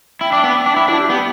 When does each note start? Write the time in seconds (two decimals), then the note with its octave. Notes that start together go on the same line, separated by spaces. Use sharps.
0.21 E4 G5
0.33 D4
0.44 B3
0.54 G5
0.66 D4
0.76 E4
0.88 D4 E4
0.99 G4
1.10 B3 G4